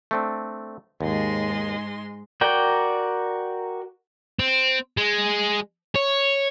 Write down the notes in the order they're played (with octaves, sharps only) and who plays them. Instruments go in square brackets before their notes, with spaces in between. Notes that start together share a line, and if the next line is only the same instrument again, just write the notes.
[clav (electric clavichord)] A3 C4 D4
[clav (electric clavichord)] D#2 [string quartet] G#2 G#3 C6
[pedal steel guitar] F#4 A#4 D5 G5
[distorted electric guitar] C4
G#3
C#5